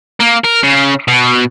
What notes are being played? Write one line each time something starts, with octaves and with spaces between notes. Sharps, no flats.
A#3
A#4
C#3
B2